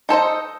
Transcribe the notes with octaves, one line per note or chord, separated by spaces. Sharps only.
D#4 A4 C5 D#5